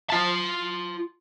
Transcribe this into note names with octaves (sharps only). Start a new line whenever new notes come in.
F4 A5